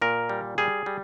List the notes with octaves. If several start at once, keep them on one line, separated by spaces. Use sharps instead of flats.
A#2 A#4
G3
G3 G#4
G3